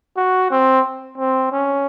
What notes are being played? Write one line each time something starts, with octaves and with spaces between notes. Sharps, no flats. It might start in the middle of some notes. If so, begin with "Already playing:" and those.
F#4
C4
C4
C#4